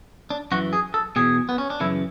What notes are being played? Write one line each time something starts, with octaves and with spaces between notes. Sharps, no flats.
D4
F#2 E3 F#4
G#4
A4
E2 B2 G#4
B3
C#4
D4
F#2 C#3 E3 E4